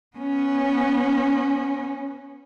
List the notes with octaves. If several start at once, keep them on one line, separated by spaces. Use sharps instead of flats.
B3 C#4